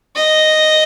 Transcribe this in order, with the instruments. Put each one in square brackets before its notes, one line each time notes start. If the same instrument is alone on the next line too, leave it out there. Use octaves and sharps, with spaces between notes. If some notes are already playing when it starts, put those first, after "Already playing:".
[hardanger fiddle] D#5